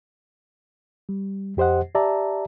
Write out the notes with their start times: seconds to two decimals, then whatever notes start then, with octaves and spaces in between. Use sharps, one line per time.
1.09 G3
1.57 F2 G4 C5 D#5 F#5
1.95 G4 D5 E5 A5 A#5